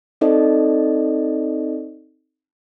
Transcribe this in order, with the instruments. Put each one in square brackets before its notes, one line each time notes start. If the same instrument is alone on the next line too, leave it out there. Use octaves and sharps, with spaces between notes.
[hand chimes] C4 D#4 A4 C5 D5 D#5